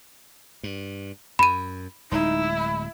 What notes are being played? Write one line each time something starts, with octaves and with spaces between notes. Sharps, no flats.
G2
F#2 B5 D#7
D1 G#3 D#4 E4
B5